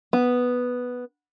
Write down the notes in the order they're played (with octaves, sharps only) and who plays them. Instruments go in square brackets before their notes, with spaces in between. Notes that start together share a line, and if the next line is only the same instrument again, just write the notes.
[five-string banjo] B3